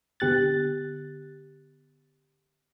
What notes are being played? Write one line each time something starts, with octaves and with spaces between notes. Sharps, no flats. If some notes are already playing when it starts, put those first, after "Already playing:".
D3 B3 G4 F#6 A6